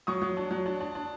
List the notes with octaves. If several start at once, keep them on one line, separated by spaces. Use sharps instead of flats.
F#3 C#6 D#6
F#3
D4
F#3
D4
D4
D4